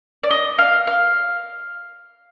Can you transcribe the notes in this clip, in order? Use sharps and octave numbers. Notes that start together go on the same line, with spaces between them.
D5
D#5
F5
F5